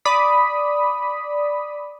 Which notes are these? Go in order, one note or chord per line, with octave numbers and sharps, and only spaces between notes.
D5 B5 D#6 B6